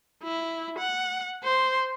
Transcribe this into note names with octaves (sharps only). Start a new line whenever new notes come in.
E4
F#5
C5